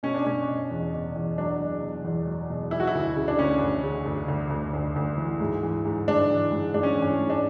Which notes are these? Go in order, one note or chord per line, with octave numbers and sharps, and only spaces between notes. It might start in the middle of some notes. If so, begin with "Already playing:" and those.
B2 C#4
D4
B2 C#4
B2
E2
B2
E2
F#3 D4
B2
B2
E2
F#3
B2
E3 E4
F#4
E4
D2
C#3
D4
D2 C#4
D2
C#3
D2
D2
D2
D2
D2
E3
G#2
E3
G#2
G#2 D4
E3
G#2
G#2 D4
C#4
E3
C#4
G#2
D4